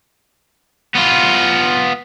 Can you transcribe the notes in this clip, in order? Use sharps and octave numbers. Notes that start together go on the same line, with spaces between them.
B3 F4